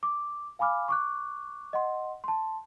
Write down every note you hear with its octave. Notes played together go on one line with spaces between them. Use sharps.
D6
F5 G#5 B5 D6 F6
C#6 D6 F#6
D#5 F#5 C6
A5 C6